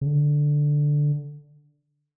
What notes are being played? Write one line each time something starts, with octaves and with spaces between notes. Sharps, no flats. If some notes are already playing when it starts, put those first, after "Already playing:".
C#3
D3